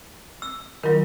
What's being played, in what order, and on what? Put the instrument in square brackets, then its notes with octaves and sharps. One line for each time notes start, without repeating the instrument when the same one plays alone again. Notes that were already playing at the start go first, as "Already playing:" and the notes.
[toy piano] E6
[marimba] D#3 F#3 [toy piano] F4 A#4